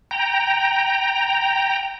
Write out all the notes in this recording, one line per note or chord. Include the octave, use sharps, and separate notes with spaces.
G5 A#5